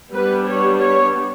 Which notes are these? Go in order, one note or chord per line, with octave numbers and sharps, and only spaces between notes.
G3 B3 D4 B4
C#5
C#5